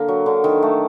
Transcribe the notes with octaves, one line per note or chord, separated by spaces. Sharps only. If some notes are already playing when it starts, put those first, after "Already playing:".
Already playing: D3 A#3
F#3
D3
D#3
A3